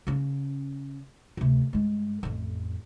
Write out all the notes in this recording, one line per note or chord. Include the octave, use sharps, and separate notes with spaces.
C#3 C#4
D2 C3
G2 G#3
A1 F2